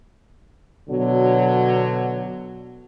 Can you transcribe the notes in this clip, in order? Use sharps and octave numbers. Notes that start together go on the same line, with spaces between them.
B2 D3 F#3